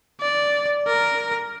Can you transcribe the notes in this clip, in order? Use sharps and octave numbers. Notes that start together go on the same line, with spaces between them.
D5
A#4